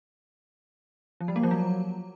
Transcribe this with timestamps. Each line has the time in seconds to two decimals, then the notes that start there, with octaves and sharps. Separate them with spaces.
1.21 F3
1.28 G3
1.36 A#3
1.43 F3
1.51 F#3